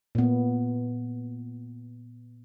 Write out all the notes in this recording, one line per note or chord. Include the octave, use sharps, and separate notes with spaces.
A#2 B3